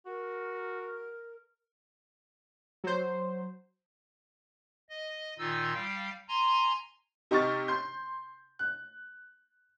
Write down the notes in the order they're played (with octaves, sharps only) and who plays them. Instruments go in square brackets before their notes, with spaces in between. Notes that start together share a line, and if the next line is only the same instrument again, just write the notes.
[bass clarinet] F#4 [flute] A#4
[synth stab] F#3 C5
[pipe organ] D#5
A#2 D#3 D#4 F4 E6
G3 F5 G5
G#5 A#5 C6
[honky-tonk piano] C3 D#4 G4 C#6 F6 A6
C6 G6
F#6